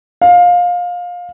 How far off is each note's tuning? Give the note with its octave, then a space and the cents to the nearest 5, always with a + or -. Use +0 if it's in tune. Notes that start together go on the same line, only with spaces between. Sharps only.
F5 +20